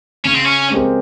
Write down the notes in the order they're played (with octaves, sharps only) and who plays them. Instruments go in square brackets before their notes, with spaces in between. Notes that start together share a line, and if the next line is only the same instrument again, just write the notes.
[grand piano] C#3 [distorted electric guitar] C#4
[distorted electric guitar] C4
C#4
[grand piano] G#3 C4 G4 A#4